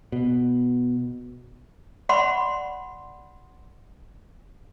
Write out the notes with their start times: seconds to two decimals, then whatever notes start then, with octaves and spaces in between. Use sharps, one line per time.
0.12 B2
2.09 D5 F#5 B5 C6